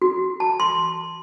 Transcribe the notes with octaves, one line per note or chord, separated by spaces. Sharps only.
F#4
A5
C6